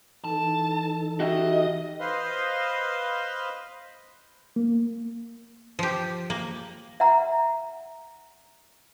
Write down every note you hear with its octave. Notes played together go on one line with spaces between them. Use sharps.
E3 D#4 A4 A5
F#4 G4 D#5 E5
B4 C5 D#5 F5 C6
A#3
F3 G4
A#3
E5 F#5 A#5